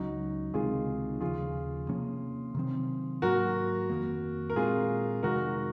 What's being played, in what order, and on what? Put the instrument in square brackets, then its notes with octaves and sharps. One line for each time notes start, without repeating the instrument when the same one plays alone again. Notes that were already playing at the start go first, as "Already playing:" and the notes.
Already playing: [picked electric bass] C#2 C#3 F#3 C#4 [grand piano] D#4 F#4
[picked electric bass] C#2 C3 D#3 G#3 [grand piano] F4 G#4
[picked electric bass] D#2 C#3 F3 [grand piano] F4 G#4
[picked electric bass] C3 F3 A#3 C#4
C3 D#3 F#3 C4
[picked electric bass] G#2 F#3 A#3 [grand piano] F#4 A#4
[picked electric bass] F2 D#3 A#3
[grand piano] A#4
[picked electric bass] A#2 G#3 C4 [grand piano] F4 G#4
[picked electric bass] F2 C3 D#3 G#3 [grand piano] F#4 A#4